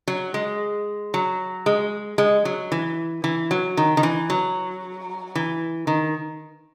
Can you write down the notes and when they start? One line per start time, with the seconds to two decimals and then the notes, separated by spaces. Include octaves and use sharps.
0.08 F#3
0.34 G#3
1.14 F#3
1.66 G#3
2.18 G#3
2.45 F#3
2.72 E3
3.24 E3
3.51 F#3
3.77 D#3
3.97 D#3
4.03 E3
4.30 F#3
5.35 E3
5.87 D#3